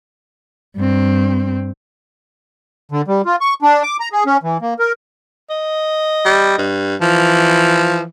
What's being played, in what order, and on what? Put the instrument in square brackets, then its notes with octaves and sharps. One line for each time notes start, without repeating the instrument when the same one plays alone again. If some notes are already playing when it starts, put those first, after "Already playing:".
[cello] G2 C4
[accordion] D3
G3
F4
C#6
D4
D6
A#5
G#4
C#4
E3
A#3
A#4
[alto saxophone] D#5
[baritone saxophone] G3
G2
[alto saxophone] E3 [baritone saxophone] F3